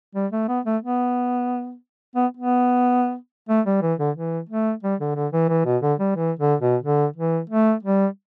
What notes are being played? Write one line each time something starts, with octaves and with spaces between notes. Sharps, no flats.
G3
A3
B3
A3
B3
B3
B3
A3
G3
E3
D3
E3
A3
G3
D3
D3
E3
E3
B2
D3
G3
E3
D3
B2
D3
E3
A3
G3